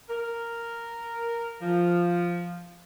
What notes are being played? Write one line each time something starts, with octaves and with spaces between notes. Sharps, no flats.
A#4
F3